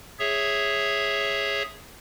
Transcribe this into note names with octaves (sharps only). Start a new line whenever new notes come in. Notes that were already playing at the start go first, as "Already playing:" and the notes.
G#4 C#5 E5